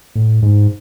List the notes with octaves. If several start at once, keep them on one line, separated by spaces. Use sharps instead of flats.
A2
G#2